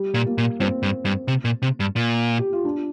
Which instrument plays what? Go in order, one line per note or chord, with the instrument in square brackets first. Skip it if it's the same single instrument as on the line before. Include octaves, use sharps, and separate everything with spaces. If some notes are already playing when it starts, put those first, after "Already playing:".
Already playing: [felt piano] G3
[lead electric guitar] A#2
[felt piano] A#3
[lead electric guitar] A#2
[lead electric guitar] G2 [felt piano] C4
[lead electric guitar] G2
G2
C3
A#2
C3
G2
A#2
[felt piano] G4
F4
D4